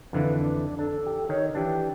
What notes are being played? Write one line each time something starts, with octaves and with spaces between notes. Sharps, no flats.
F2 D3 E3 B4
D4
D4 A4
G4
D#3 C#5
E3 D4 G4